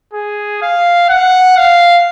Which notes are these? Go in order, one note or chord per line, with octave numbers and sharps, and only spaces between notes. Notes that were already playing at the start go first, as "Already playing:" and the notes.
G#4
F5
F#5
F5